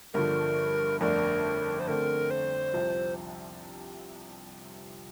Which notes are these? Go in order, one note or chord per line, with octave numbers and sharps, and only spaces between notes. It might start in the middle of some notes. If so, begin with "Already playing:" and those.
G1 G2 D3 F3 A#4
G1 F2 D3 A3 D4 A#4
C5
D3 A3 C4 A#4
C5
C2 C3 F3